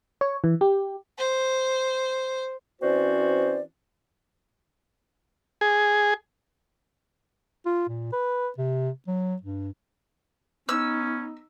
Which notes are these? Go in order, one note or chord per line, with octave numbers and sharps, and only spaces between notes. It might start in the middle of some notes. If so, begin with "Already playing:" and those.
C#5
E3
G4
C5
E3 C4 C#4 F#4 C5 D5
G#4
F4
A#2
B4
C3
F#3
G2
B3 C#4 D#4 E6